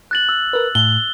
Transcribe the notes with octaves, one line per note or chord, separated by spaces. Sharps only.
F#6 A6 F#7
E6
A#4 B4
A2 G7